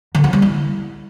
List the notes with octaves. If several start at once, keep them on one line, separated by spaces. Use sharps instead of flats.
D3
F3
G3
E4